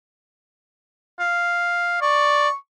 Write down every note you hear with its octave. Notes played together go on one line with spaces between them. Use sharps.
F5
D5 C#6